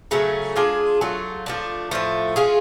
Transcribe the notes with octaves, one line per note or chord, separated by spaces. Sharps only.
C#3 F#3 A3 C#4
G#3 D4 F4 G#4
F#3 A3 F4
F3 A3 D4
A2 F3 A3
G#3 C#4 F4 G#4